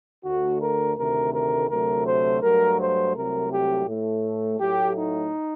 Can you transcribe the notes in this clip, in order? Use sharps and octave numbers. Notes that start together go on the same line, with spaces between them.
D2 D3 A3 F#4
A#4
D2 C3 D#3 A3 A#4
A#4
D2 C3 F#3 A3 A#4
C5
G2 F#3 A3 A#4
C5
C2 C3 F#3 A3 A#4
G4
A2 A3
A2 F#3 A3 G4
D#4